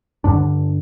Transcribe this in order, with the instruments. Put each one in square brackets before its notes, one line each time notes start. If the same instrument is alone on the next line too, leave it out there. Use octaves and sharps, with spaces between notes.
[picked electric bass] G2 D3 D4